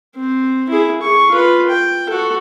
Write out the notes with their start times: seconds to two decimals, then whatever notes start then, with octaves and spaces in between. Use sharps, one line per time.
0.16 C4
0.69 E4 G#4
1.02 G#4 C#6
1.31 F4 B4
1.69 G5
2.09 F#4 A4